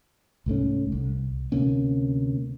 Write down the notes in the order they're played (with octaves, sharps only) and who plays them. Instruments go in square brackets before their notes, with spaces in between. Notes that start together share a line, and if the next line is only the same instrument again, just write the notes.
[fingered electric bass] C2 G#2 A3 C#4
C2
D2 C3 A#3 C#4